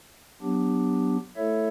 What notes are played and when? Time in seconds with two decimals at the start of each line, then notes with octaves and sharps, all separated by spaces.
0.42 F#3 B3 D4 G4
1.36 A3 E4 A4 C#5 E5